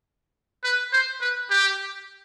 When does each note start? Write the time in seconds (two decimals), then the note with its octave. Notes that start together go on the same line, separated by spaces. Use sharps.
0.63 B4
0.93 C5
1.21 B4
1.50 G4